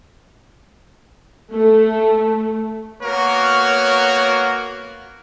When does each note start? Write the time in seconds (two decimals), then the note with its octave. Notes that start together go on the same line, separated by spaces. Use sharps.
1.54 A3
3.03 A#3 B3 F#4 A#4 C#5